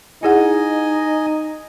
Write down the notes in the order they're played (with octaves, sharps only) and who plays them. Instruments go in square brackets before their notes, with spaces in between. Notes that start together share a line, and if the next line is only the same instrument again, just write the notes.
[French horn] D#4 [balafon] E4 G#4 F#5 [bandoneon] D#5 G#5